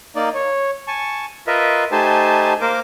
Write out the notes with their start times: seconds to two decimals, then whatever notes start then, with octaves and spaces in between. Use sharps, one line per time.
0.16 A#3 D#4 D5
0.35 C#5
0.88 G#5 A5 C#6
1.47 F4 A#4 B4 D#5 E5
1.92 A3 D#4 G4 C5 G#5 A5
2.61 A#3 A#4 C5 D6